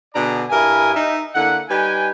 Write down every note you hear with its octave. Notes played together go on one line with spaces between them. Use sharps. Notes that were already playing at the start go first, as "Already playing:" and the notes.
B2 D3 D4 G#4 D5 A#5
G2 E4 A#4 G#5
D#4 E5
D3 A#3 E4 F#5
G3 D#4 B4 G5 G#5